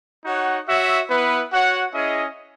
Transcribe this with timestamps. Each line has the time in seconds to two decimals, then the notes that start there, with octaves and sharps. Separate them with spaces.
0.25 D#4 F#4 C#5 F#5
0.67 F#4 C#5 E5
1.09 B3 E4 B4
1.51 F#4 C#5 F#5
1.92 C#4 E4 G#4 D#5